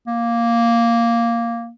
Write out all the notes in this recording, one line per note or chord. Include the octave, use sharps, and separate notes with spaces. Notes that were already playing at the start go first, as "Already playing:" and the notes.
A#3